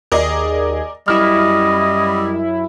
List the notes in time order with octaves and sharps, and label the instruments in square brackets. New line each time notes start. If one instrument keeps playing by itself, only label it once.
[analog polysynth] D#2 G#4 [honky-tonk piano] A#4 D5 D#5
[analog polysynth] F#2 E4 [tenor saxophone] G3 [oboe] D#5 [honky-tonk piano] F6